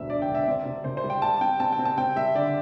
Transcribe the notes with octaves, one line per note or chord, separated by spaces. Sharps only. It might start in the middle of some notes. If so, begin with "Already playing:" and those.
Already playing: E1 D2 G2 E5
D3 D5
G5
E1
E5
C4 D5
C3
C3 C5
C5
G3
G5
G3 A5
C4 G5
C4 A5
G5
C4
A5
C4 G5
G3 E5
D3 D5